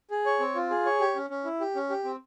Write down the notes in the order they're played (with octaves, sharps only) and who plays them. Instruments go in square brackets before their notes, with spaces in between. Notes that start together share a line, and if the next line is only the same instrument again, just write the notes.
[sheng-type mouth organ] G#4
C#5
C4
F4
G#4
C#5
G4
C#4
C#4
E4
G4
C#4
G4
C4